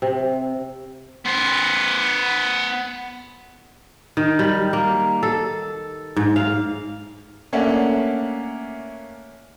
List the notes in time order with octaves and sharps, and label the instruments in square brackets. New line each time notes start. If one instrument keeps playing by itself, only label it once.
[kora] C3
[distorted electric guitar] B3 C5
[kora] D#3
G3
A#3
A4
G#2
F5
[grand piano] A3 A#3 C#4 D4 E5 F#5